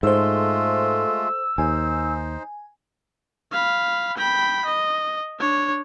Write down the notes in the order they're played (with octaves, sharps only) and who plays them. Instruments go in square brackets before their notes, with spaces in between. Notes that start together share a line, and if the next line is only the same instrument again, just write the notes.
[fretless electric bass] G#2 [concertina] G#3 A3 F4 [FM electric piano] A4 C5 [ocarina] E6
[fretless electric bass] D#2 [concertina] D#4 C5 [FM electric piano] G#5
[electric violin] F5 B5
G5 B5
D#5
D4 C#5